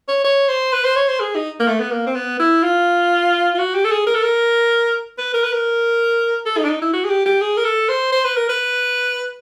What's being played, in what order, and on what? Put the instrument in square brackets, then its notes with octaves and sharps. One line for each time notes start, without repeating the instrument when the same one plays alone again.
[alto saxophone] C#5
C#5
C5
B4
C5
C#5
C5
G#4
D#4
A#3
A3
B3
A#3
C4
B3
E4
F4
F4
F#4
G4
A4
G#4
A#4
A4
A#4
B4
A#4
B4
A#4
A4
D#4
D4
D#4
E4
F#4
G#4
G4
G4
G#4
A#4
A4
C5
C5
B4
A#4
B4